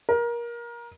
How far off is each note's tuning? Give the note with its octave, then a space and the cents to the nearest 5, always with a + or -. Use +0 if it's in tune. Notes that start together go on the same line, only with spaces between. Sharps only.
A#4 +20